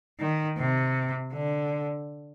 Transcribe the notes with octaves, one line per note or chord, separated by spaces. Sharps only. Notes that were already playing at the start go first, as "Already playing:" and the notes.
D#3
C3
D3